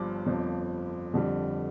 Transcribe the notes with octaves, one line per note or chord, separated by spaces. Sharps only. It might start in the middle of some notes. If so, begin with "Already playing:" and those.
Already playing: G1 G2 F3 D6
G1 F2 F3
F2 D3 G3